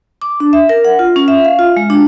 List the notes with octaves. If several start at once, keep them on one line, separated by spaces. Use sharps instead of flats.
D6
D4
E5
A#4
F#5
F4
C#4
E5
F5
F4
G#3
D4